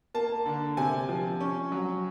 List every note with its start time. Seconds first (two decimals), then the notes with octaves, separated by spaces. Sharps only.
0.14 A#3 A5
0.46 D3
0.77 C3 G#5
1.09 F3
1.40 C#4
1.72 F#3